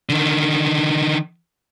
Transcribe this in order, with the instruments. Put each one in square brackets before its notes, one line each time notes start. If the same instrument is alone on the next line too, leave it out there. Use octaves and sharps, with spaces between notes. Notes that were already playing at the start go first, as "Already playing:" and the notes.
[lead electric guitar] D3 D#3